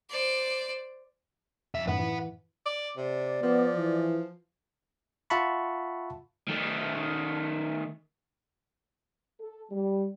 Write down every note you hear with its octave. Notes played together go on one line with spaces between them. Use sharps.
C5 D5
F2 E5
F#2 A2 D#3 B4 F#5
E3
D5
C3 D5
F3 B3
E3
F4 E5 F#5 A5 B5 C#6
D#3 A3
A4
G3